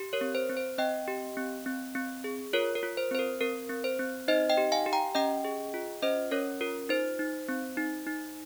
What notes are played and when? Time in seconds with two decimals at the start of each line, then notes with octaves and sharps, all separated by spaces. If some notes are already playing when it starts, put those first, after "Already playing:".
Already playing: G4
0.13 A#4 C#5
0.21 C4
0.35 C5
0.49 C4
0.57 C5
0.78 C4 D#5 G5
1.08 G4
1.37 C4
1.66 C4
1.95 C4
2.24 G#4
2.53 F4 A#4 C#5
2.75 A#4
2.83 F4
2.97 C5
3.11 C4 C5
3.19 A#4
3.40 C4 A#4
3.70 C4
3.84 C5
3.99 C4
4.28 D#4 C5 D#5
4.50 D#5 G5
4.57 G4
4.72 F5 G#5
4.86 G4
4.93 G5 A#5
5.15 C#4 D#5 G5
5.45 G#4
5.74 F4
6.02 C#4 C5 D#5
6.31 C#4 A#4 C#5
6.61 F4 A#4
6.89 D#4 C5
7.19 D#4
7.49 C4
7.77 D#4
8.07 D#4